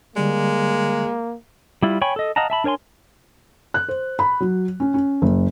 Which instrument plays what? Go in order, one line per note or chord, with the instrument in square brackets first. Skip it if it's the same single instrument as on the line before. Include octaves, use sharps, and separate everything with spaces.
[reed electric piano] D3 G3 D5 [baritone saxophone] G#3 [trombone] A#3
[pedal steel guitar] G3 E4 F4
C#5 G5 G#5 B5 C#6
A4 D#5
D#5 F5 F#5 A5 A#5
E5 A5 B5
D4 A#4 C#5 G#5 C6
[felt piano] F#6
C5
B5
F#3
C#4
C#4
F#1